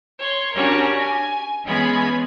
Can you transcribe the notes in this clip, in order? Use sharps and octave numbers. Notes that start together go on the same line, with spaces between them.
C#5 C6
C#4 D4 F#4 G4 A#4 C#5
G#5
E3 G#3 B3 C#4 G#4 B5